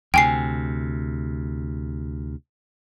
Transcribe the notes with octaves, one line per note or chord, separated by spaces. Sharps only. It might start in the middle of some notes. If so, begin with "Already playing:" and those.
D2 C3 G5 G#5 C7